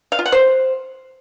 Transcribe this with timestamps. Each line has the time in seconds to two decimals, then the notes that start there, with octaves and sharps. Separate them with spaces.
0.12 F5
0.19 F4
0.26 F#5
0.32 C5